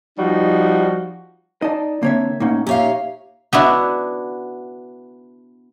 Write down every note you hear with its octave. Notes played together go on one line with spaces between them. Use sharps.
F3 G3 D#4 F#4
D#4 D5 D#5 A5
D3 A#3 C4 C#5 E5
A2 A#3 C#4 D#4 F#5
A#2 D#4 G4 C#5 E5 F5
B3 D4 E4 F#4